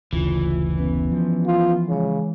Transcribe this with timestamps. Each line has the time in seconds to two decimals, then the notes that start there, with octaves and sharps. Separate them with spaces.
0.13 F#1 D2 C#3 E3 F4
0.78 B3 C#4 B4
1.12 F3
1.46 F4
1.89 C#3 G#3 C#5